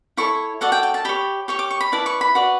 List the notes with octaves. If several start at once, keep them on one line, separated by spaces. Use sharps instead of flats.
E4 A4 C#5 C#6
F#4 A4 D5 F#5
G5
G5
A5
G4 C#5 B5
G4 C#5 C#6
D6
C#6
B5
E4 B4 D5 A5
C#6
B5
F#4 B4 D5